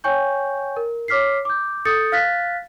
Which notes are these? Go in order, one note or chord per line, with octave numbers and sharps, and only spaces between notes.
C#5 G5 G#5 C#6 G6
A#4
C#5 D6 F6 B6 C7
D6 G6
A4 D#6 G6 A6 C#7
F5 F6 F#6 A6 B6